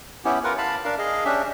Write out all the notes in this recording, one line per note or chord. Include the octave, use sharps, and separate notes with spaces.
B3 C#4 E4 G4
F4 A#4 B4 F#5
F5 A5 B5
D4 A#4 F5
G#4 D#5 F5
C#4 D4 G4 E5